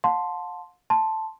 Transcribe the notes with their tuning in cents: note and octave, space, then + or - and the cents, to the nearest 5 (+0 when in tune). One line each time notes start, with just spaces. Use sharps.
F5 +45 A5 +0 C6 +0
A5 +0 C6 +0